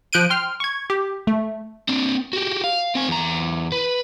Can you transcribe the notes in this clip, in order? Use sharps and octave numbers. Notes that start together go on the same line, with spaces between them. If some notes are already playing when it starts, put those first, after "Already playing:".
F3 F#6 G6 D7 D#7
G5 C6 F6
C#6 G#6
G4
A3
C4 D4
F#4 G4
F5
C4 G#5
E2 A#5
B4